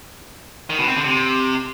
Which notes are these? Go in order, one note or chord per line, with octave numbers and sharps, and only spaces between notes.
D#3
B2
C4
D3
C3